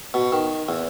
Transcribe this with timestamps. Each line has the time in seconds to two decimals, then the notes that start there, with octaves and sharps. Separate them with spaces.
0.14 B2
0.32 D#3
0.69 E2